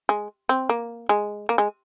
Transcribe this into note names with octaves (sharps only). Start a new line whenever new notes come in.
G#3
C4
A#3
G#3
A#3
G#3